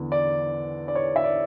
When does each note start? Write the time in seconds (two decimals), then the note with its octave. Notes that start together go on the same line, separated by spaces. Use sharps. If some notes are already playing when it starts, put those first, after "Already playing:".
Already playing: E2 D3
0.12 D5
0.88 D5
0.95 C#5
1.16 E5
1.24 D5